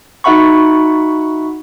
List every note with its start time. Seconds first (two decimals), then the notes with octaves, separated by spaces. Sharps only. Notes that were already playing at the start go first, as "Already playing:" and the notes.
0.24 D#4 F#4 E5 F#5 B5 C#6